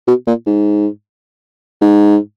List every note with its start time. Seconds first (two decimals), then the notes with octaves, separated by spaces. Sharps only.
0.08 B2
0.27 A#2
0.46 G#2
1.82 G#2